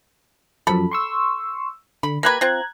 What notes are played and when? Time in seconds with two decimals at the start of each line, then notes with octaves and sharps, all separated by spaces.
0.67 F#2 F3 A4 B5
0.91 C6 C#6 E6
2.03 D3 B5
2.23 A#3 G4 B4 A#5 F#6 G#6
2.41 C4 F4